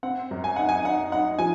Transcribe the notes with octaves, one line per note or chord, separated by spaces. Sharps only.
C4 F#5
F#2
G#5
D#4 F#5
G#5
D#4 F#5
D#4 F#5
F3 G#5